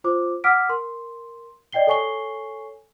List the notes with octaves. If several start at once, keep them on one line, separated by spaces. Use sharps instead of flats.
F4 C5 D6
F#5 D6 E6 F6 B6 D7
A#4 C6
D5 D#5 G5 C7 G7
A4 C#5 G#5 C#6 C7 G7